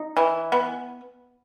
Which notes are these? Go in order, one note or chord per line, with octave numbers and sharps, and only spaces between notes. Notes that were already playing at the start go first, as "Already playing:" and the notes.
Already playing: D#4
E3
B3